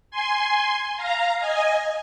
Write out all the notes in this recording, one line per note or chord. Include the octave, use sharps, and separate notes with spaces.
G#5 C6
F5 A#5
D#5 G#5